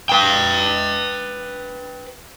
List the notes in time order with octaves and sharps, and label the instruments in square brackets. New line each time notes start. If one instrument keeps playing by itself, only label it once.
[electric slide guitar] B4 G5